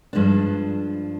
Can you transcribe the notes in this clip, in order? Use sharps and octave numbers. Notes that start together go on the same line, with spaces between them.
G2 F3 G#3 D4